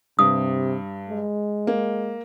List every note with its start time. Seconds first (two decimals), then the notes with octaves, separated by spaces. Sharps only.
0.19 G2 C3 D#6
1.09 G#3
1.67 A#3